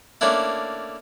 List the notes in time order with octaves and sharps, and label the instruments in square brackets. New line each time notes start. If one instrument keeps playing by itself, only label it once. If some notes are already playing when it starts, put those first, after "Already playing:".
[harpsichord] A3 A#3 C#4 D4 E4